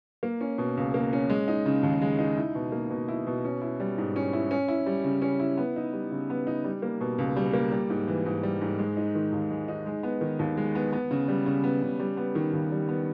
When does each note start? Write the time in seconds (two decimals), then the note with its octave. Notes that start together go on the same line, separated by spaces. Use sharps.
0.23 A#3
0.41 C#4
0.58 B2
0.77 C#2
0.94 A#3
1.13 C#4
1.30 G#3
1.48 D#4
1.66 C#3
1.83 D#2
2.02 G#3
2.19 D#4
2.37 E4
2.55 B2
2.72 A#3
2.90 B2
3.08 E4
3.27 B2
3.45 C#4
3.61 E4
3.80 G3
3.98 G#2
4.16 C#4
4.33 E4
4.51 C#4
4.68 E4
4.86 G3
5.04 C#3
5.22 C#4
5.40 E4
5.57 B3
5.76 D#4
5.93 G3
6.12 C#3
6.30 B3
6.47 D#4
6.64 G3
6.82 A#3
7.01 B2
7.18 C#2
7.36 G3
7.53 A#3
7.72 G3
7.90 G#2
8.08 E3
8.26 G#2
8.43 G3
8.61 G#2
8.79 G#3
8.97 D#4
9.15 D#3
9.32 D#2
9.51 G#3
9.68 D#4
9.86 G#3
10.03 B3
10.21 D#3
10.39 D#2
10.57 G#3
10.75 B3
10.93 B3
11.11 C#3
11.28 G3
11.46 C#3
11.64 B3
11.83 C#3
12.00 G3
12.17 B3
12.35 D#3
12.53 D#2
12.72 G3
12.89 B3